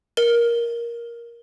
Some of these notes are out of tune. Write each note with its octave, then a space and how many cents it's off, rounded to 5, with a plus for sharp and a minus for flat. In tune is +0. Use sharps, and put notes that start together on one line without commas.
A#4 +10